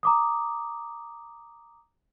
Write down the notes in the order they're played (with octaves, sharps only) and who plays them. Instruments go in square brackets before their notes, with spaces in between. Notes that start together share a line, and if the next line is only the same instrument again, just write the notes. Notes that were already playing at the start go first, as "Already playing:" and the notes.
[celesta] A#5 D6 D#6